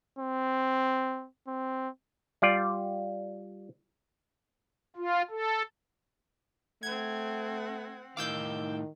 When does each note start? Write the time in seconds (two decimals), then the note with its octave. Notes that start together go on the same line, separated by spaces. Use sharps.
0.19 C4
1.48 C4
2.42 G3 F4 D5
4.96 F4
5.30 A4
6.83 A3 C4 F#5 G#6
8.17 A2 D#3 D#4 F5 D6 E6 G6